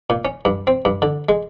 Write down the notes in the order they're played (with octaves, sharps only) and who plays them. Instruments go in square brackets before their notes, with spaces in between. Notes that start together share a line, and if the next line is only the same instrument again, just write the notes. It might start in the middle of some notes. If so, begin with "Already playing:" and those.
[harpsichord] A#2
C#4
G2
C4
G2
D3
G#3